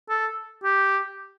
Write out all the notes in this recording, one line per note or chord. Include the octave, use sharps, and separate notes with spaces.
A4
G4